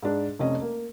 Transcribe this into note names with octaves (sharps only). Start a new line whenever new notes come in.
G#2 D4
F1 C3 C#4 D#5
A#3